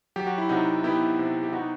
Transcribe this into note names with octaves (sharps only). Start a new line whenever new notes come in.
F#3 G4
F#4
E4
C3 D#4 F#4
B3 E4 G4
C3
G4
B3 D#4 F#4